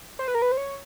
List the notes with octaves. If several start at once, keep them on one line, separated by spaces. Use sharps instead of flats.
C5
B4
A#4
B4
C5
C#5